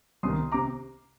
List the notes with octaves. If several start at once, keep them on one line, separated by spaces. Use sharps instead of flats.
C2 C3 D#3 C6 D#6
C3 A#5 D6